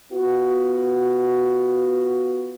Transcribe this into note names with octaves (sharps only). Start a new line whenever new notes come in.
B3 F4 F#4